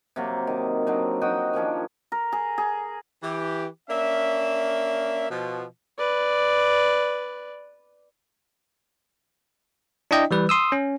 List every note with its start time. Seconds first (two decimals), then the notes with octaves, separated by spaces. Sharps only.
0.16 C3 F#3 A#3
0.47 D#3
0.87 F#3 C4 D4 D#4
1.21 D#4 F#4 D#5 G5
1.53 D#3 F3 C#4 D4
2.12 A#4
2.32 G#4
2.58 G#4
3.23 E3 G4
3.90 A#3 C#4 D4 E5
5.30 B2 F3
5.98 B4 D5
10.11 D4 E4 D5 D#5 G5
10.31 E3 G3 B4
10.49 C6 D#6 E6
10.72 C#4